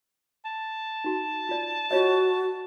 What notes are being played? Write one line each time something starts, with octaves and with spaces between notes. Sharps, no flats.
A5
D#4 F#4
F4 D5
F4 F#4 C#5 D#5